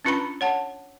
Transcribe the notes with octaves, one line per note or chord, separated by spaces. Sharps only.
C#4 D4 F4 B4 A#5 B5
C#5 F#5 A5